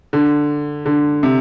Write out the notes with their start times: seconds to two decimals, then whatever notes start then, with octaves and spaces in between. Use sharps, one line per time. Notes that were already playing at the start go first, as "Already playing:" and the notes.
0.13 D3
0.86 D3
1.23 C3